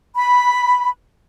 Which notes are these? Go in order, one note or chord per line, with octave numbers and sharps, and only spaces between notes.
B5